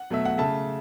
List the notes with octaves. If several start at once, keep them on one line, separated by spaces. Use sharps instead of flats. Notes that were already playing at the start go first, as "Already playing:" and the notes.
Already playing: F#5
B2 F#3 A3 E5
F#5
C#3 A3 E5 A5